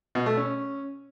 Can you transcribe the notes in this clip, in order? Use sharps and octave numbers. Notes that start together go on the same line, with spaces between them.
B2
A3
C#4